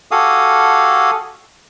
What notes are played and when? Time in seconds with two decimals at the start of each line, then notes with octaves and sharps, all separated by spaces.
0.11 F#4 G4 A4 F5 G#5 D#6